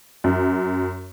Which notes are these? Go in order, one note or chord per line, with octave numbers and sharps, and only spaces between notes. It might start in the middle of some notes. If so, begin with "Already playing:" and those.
F#2